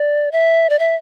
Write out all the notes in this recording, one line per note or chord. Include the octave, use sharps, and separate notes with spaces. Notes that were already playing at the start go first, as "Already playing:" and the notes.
Already playing: D5
E5
D5
E5